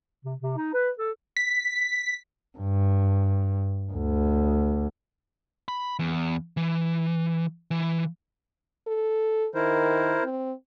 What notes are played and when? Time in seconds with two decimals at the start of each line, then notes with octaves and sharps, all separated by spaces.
0.24 C3
0.42 C3
0.56 D#4
0.74 B4
0.99 A4
1.37 B6
2.59 G2
3.92 D2
5.68 B5
5.99 E2
6.57 E3
7.71 E3
8.87 A4
9.55 D#3 E4 A#4 C5
10.23 C4